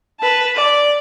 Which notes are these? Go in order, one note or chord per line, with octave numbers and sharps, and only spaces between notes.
B4 A5
D5